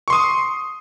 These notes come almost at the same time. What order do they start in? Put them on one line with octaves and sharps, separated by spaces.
C#6 C6 D#6